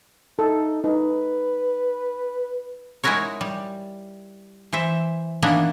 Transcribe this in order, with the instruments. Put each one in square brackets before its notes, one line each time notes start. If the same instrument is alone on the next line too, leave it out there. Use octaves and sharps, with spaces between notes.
[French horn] D#4 [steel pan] A4
[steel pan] D#4 [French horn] B4
[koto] G#3 D#4 E4 F#4 A#4 C#5
G3
E3 C5 E5
D#3 E3 A#3 B3 D4 E4